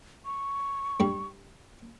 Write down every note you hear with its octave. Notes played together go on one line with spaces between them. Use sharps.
C#6
G2 G3